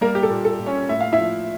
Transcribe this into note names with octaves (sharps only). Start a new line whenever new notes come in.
G3 A#3 A#4
G4
A4
A#2
A4
A#2
C#4 C#5
A2 E5
F5
E4 E5
F3